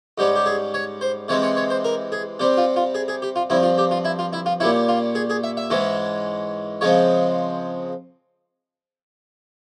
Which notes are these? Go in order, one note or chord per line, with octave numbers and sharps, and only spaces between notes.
G#2 G3 C#4 G4
G4
G#4
C#5
C5
C3 E3 G#3 C4 C#5
C#5
C#5
C5
A#4
G#4
C3 G3 C4 G4
F4
F4
G#4
G#4
G4
F4
G2 F3 C4 E4
F4
G4
F4
E4
F4
E4
F4
A#2 G3 C#4 E4
F4
G#4
G#4
E5
E5
G#2 E3 G#3 C#4
C#3 F3 G#3 C4 C#5